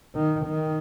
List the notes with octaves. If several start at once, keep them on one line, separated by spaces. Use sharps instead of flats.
D#3
D#3